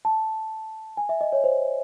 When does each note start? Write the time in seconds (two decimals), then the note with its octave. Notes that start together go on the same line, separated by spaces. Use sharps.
0.05 A5
0.97 G#5
1.09 E5
1.21 D#5
1.33 C#5
1.44 C5